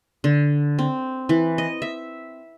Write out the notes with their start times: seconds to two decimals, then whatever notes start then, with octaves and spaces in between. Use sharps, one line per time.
0.24 D3
0.79 C4
1.29 E3
1.58 D#5
1.82 E5